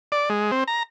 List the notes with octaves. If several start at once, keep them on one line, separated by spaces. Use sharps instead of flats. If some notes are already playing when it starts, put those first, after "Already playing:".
D5
G#3
C4
A#5